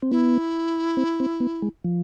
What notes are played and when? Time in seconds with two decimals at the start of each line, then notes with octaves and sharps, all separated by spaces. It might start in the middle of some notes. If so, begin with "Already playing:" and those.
0.02 C4
0.11 B3 E4
0.97 C4
1.20 C4
1.40 B3
1.62 G#3
1.84 F3